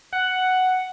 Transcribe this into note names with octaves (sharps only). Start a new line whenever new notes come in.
F#5